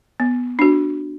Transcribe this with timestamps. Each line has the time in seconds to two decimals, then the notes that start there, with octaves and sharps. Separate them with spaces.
0.20 B3
0.59 D4 F#4